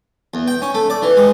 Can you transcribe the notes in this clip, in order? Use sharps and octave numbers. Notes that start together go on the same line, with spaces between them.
E2
G5
C#4
A3
D5
E3
G#3